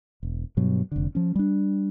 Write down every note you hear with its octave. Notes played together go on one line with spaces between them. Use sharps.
E1
G2 B2 F#3
F1 D3
F3 C#4
G3 D4